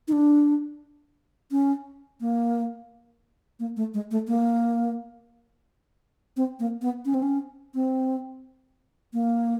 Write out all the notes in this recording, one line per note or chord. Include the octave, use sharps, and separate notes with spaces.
D#4
D4
C#4
A#3
A#3
A3
G#3
A3
A#3
C4
A#3
B3
C#4
C4
C#4
C4
A#3